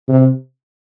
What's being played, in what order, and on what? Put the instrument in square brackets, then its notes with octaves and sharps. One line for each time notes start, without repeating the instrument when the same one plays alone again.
[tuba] C3